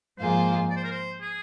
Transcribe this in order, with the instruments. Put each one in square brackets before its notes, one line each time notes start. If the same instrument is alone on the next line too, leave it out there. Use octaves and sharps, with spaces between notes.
[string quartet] G#2 F3 A#3 F4 G#4 [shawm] C5
[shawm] D5
C5
A#4
C5
G#4